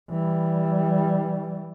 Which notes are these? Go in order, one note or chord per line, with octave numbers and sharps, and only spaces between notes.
E3 G3